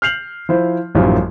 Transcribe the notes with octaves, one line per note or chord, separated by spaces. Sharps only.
F6 G6 C7 F7 F#7
F3 E4 C5
A1 F#2 D#3 F3 G3